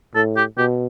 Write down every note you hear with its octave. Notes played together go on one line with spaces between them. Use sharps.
A2 A4
G4
B2 G4